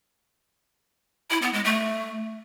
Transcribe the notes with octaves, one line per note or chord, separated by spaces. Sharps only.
E4
B3
G#3
A3